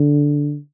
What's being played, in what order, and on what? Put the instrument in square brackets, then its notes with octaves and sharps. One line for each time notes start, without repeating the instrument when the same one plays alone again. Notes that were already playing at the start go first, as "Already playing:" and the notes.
Already playing: [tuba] D3